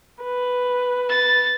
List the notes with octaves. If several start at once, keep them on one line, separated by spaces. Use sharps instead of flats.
B4
A6